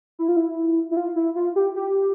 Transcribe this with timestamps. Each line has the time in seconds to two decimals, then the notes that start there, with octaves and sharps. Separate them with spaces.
0.19 E4
0.28 F4
0.37 E4
0.91 E4
0.97 F4
1.16 E4
1.36 F4
1.56 G4
1.76 G4